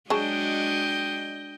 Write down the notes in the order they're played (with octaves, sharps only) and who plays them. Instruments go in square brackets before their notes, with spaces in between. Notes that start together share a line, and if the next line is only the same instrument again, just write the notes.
[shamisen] F#3 G#4 A5 [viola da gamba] G#3 D4 F#4 [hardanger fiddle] D#5 G5